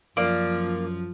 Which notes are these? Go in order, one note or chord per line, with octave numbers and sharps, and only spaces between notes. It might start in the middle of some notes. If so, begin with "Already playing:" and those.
F#2 F3 A#3 D5